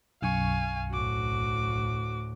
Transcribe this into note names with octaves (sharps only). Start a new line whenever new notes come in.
B1 F#2 F5 G#5 C#6
D2 A2 F#4 D6